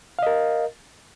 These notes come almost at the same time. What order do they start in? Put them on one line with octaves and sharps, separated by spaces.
F5 D#5 A#4